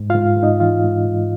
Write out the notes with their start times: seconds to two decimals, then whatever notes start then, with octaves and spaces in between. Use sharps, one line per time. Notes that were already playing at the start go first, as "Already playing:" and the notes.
Already playing: G#2
0.10 F4 F5
0.14 G#2
0.37 G#2
0.43 D#4 D#5
0.60 E3 F4 F5
0.83 G#2
1.05 G#2